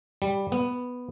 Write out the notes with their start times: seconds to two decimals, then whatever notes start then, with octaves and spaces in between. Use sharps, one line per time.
0.22 G3
0.52 B3